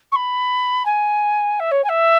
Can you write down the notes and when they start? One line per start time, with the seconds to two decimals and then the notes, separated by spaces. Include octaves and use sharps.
0.12 C#6
0.15 B5
0.85 G#5
1.59 E5
1.71 C#5
1.84 G#5
1.89 E5